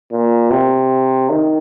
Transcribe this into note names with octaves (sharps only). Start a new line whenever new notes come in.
A#2
C3
D#3